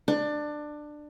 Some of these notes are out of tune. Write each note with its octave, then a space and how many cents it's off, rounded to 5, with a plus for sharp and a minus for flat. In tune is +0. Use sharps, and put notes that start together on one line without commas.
D4 +20